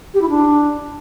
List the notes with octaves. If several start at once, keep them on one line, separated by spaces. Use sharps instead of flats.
G4
E4
D4